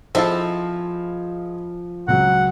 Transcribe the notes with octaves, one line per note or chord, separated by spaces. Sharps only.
F3 C4 E4 G#4 A4 D#5 F5
C#2 F#3 F#5